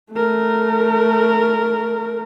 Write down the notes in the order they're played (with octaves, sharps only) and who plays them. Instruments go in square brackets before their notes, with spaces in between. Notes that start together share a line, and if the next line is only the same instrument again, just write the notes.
[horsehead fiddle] A3 A#4